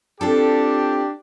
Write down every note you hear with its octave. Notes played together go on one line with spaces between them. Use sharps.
C4 D4 F4 G4 A4